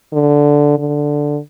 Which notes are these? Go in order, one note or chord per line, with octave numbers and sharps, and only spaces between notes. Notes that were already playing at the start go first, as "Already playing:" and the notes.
D3
D3